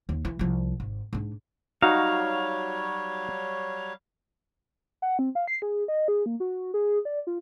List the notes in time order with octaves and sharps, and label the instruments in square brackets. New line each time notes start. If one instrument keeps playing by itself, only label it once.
[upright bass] D#2
E3
C2 F3
G#1
G#2 D4
[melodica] F#3 G3 C#5 [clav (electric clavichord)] D#4 F#4 A#5 [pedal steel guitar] F5
[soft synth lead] F#5
C4
F5
C7
G#4
D#5
G#4
A#3
F#4
G#4
D5
F4